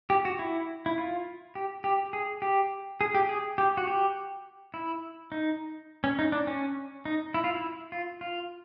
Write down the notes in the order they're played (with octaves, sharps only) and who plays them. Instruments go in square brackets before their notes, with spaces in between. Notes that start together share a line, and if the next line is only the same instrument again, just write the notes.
[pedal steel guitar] G4
F#4
E4
E4
F4
G4
G4
G#4
G4
G#4
G4
G#4
G4
F#4
G4
E4
D#4
C#4
D#4
D4
C#4
D#4
E4
F4
E4
F4
F4